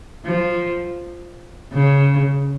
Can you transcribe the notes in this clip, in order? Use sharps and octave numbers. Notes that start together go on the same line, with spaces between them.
F3
C#3